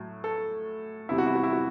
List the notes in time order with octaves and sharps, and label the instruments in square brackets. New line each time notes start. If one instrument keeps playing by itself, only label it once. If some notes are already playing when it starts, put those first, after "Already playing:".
Already playing: [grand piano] A2 F#3
A4
E2 C3 G3 E4
F#4
E4
F#4
E4
F#4